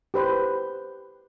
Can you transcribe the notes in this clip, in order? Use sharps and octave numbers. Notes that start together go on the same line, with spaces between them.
G4 B4 C5